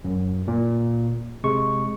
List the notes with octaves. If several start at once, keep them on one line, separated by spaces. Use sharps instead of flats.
F#2
A#2
C3 G#3 C#6